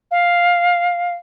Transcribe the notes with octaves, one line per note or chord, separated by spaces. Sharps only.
F5